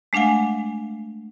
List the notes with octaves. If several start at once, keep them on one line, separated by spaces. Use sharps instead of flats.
G#3 A3 D4 F5 F#5 G#5